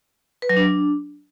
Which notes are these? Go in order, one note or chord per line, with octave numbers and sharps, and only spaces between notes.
B4
F#3
D4